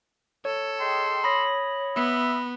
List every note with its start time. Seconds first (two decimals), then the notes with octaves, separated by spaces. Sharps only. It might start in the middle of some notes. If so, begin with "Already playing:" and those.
0.45 A4 C#5
0.80 G#4 D#5 G5 C6
1.24 C#5 B5 D#6 A#6
1.96 B3 E5